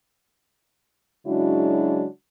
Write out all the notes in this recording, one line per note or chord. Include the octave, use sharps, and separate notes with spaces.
C#3 F#3 G#3 D4 E4 F#4